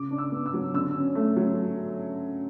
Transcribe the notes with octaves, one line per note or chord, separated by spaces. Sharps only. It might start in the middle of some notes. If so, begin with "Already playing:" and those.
Already playing: C#3 D6
D4
E6
B3
E6
F#3
D3 E6
C#4
A3
F#3